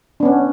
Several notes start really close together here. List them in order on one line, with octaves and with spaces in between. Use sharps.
D4 B3 C#4